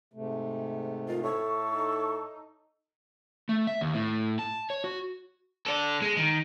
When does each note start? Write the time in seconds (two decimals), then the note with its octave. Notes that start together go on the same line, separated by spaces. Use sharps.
0.13 G#2 C3 A3
1.08 D#3 F4
1.24 A2 A4 C#6
1.71 D#4
3.49 A3
3.67 E5
3.81 D#2
3.94 A2
4.39 A5
4.70 C#5
4.84 F#4
5.66 A4 D5
6.02 G#3
6.17 D#3